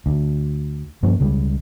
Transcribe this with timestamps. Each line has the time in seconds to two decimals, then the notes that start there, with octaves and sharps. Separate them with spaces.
0.06 D2
1.03 G2 F3 A#3 C#4
1.20 C#2 C#3 G3 G#3